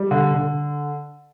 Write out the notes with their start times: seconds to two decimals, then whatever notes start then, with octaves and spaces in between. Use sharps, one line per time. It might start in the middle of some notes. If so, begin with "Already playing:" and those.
Already playing: G3
0.11 D3
0.34 D3